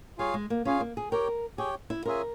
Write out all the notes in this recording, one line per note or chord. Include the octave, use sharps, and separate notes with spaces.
G3 F4 G#4 C#5 F5 G#5
G#3
A#3
C#4 F4 G#4 C#5 F5 G#5
A#3
G#4
G4 A#4 C#5 G5
G4 G#4 C#5 G5
E4
C#4 F4 G#4 A#4 E5 G#5